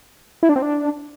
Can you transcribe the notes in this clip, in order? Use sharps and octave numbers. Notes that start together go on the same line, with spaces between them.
E4
D4
C4
D4